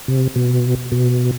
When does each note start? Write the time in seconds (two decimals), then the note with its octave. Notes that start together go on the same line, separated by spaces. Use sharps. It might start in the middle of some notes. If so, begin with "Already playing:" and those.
0.08 C3
0.36 B2
0.92 B2